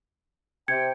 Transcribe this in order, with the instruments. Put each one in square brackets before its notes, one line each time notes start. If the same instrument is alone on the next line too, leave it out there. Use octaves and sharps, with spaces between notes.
[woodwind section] C3 G5 [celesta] G#6 C#7